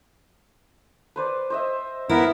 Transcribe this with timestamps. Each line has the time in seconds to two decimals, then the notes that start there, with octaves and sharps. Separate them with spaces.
1.16 B4 C5 D5
1.50 C5 D#5 E5
2.09 B3 E4 A#4